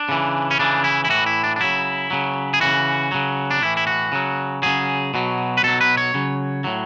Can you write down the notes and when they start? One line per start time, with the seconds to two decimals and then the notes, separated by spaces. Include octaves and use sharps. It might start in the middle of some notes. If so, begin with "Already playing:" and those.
Already playing: D4
0.09 C#3 E3
0.51 C#4
0.59 C#3 E3 D4
0.84 E4
1.05 E4
1.09 A2 E3 F#4
1.26 E4
1.44 D4
1.56 D4
1.60 C#3 F#3 E4
2.11 C#3 F#3
2.54 G#4
2.60 C#3 E3 F#4
3.12 C#3 F#3
3.51 D4
3.62 A2 E3 E4
3.77 E4
3.87 F#4
4.12 C#3 F#3
4.63 C#3 F#3 G#4
5.14 B2 F#3
5.57 B4
5.63 B2 F#3 A4
5.81 B4
5.97 C#5
6.14 C#3 F#3
6.64 A2 F#3